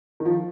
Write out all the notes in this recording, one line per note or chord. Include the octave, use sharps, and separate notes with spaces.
D#3
F3